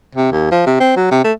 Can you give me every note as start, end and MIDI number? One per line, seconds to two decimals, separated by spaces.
0.16 0.31 48
0.32 0.46 39
0.52 0.61 53
0.67 0.75 48
0.80 0.95 60
0.97 1.09 54
1.11 1.24 48
1.24 1.32 57